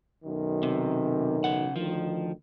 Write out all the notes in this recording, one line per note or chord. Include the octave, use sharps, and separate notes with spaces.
B1 F#2 D#3
C3
C#3 F#5
D2 D#3 F3